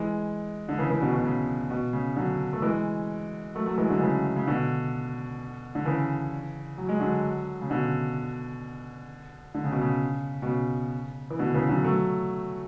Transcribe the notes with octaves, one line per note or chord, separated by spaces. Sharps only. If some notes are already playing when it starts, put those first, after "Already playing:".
Already playing: E3 G#3
D3
C#3 E3
C#3 E3
B2 D3
B2
C#3
B2
C#3
D3 F#3
A3
E3 G#3
F#3 A3
F#3 A3
E3 G#3
D3 F#3
C#3 E3
C#3
B2 D3
D3
C#3 E3
F#3
G#3
D3 F#3
C#3
B2 D3
D3
C#3
B2
C#3
B2
C#3
E3
B2 D3
C#3 E3
D3 F#3
F#3 A3